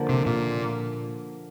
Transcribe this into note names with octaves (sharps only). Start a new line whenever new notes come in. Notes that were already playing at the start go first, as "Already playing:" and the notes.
Already playing: D3 F3 A#3
C3
A#2